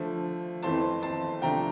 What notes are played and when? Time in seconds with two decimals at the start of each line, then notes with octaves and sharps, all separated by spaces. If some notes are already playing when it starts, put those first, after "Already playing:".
Already playing: D3 F3 A3
0.63 F2 E3 A3 C4 A5 C6
1.02 A5 C6
1.42 C3 F3 A3 D4 G5 A#5